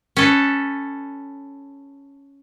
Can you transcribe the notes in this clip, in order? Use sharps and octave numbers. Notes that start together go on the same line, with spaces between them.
C#4 A4 B4